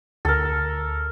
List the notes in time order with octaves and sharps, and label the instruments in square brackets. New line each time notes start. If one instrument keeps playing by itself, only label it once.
[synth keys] D2 [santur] A4 A#4